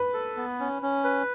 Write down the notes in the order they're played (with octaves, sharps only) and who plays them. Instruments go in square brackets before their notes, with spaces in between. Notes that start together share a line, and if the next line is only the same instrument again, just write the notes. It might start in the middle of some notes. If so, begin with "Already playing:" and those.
Already playing: [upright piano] B4
[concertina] A4
B3
C#4
C#4
B4